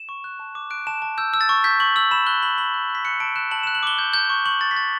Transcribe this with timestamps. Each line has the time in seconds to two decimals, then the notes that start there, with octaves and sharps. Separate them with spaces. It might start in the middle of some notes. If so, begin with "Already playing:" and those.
Already playing: E7
0.09 C#6
0.24 F#6
0.39 A5
0.55 D6
0.70 F#6 D7
0.87 A5 E7
1.02 A5
1.18 E6 G6
1.34 E6
1.41 A6
1.49 C#6
1.64 G6 B6
1.80 C#6 F#7
1.96 E6 F#7
2.11 B5 E7
2.26 F#6 G7
2.42 B5 F#7
2.58 B5 F#7
2.74 F#6
2.89 F#6
2.95 B6
3.05 F#6 C#7
3.20 A5 D7
3.36 F#6 E7
3.51 A5 F#7
3.63 F#6 E7
3.75 F#7
3.83 D6 G7
3.99 G6
4.13 G6
4.30 C#6
4.46 C#6 F#7
4.61 C#6 A6
4.71 B6
4.76 G6 A6